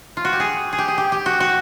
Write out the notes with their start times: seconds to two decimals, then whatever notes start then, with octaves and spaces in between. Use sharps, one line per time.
0.17 F4
0.25 F#4
0.33 G4
0.40 G#4
0.73 G#4
0.78 G4
0.88 G#4
0.98 G4
1.12 G4
1.26 F#4
1.40 F#4